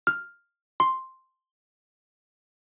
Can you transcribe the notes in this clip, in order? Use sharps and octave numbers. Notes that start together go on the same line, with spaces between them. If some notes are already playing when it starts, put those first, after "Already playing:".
F6
C6